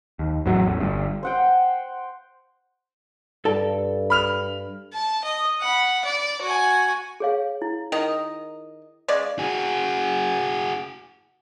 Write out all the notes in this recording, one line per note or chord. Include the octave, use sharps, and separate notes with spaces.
D#2
A1 E2 A2 F#3
A1 E2
G1 G2
C5 F#5 G5
G2 A4 D5 A5
B5 F6 F7
A5
D#5
F#5 B5
D5
F#4 G#5
G#4 C#5 F5
E4
D#3 A#4 D#5
C#3 G#3 D5
F#4 G#4